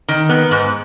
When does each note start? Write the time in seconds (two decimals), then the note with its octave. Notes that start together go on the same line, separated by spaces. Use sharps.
0.08 D#3
0.29 B3
0.51 G#2